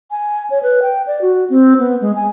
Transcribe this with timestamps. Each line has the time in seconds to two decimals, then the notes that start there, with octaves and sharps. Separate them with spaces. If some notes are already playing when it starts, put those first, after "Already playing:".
0.11 G#5
0.50 C#5
0.63 B4
0.82 G5
1.07 D5
1.21 F#4
1.50 C4
1.79 B3
2.01 G#3
2.15 G#5